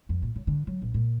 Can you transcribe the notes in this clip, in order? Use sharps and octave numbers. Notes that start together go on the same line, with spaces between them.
F2
A#2
C#3
D3
F#3
A#1
A#2